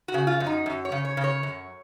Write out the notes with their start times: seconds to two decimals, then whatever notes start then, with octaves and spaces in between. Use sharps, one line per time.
0.08 F#4
0.14 C#3
0.27 F4
0.40 F#2
0.46 D#4
0.66 F#2
0.85 C#5
0.92 C#3
1.05 C#5
1.17 C#3
1.24 C#5
1.43 F#2